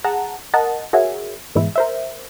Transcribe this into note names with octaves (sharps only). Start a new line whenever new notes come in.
G#4 F#5 A5 A#5
A#4 D#5 F#5 A5
F#4 G#4 A#4 C#5 E5
G#2 B2 E3 G#3 E4
A#4 C5 E5